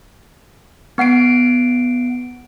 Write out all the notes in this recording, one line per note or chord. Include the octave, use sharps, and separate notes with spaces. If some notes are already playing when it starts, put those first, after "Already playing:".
B3 F#5 C7 D7